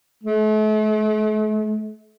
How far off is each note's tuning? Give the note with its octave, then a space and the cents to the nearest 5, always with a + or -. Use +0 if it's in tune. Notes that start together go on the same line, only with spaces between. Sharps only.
A3 -40